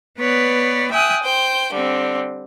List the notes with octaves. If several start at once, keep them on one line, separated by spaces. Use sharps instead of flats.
B3 B4 C#5 D5
E5 G5 G#5 D#6 F#6
C5 G5
D3 G3 C4